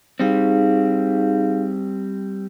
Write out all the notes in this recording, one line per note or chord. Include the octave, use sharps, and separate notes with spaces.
G3 C4 D#4 G#4 F5